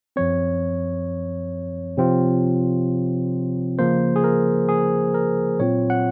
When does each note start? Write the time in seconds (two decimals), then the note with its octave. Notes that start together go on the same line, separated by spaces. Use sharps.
0.16 F#2 F3 C4 C#5
1.97 C3 F3 C4 F4
3.79 C#3 F3 A#3 C5
4.16 G#4
4.24 A#4
4.69 G#4
5.14 A#4
5.60 A#2 F#3 C4 F4 C#5
5.90 F#5